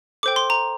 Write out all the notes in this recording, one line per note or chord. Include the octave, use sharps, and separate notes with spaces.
A4 C5 G5 D6
C6
A#5